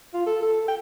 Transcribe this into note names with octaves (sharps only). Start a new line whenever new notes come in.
F4
A4
A4
G5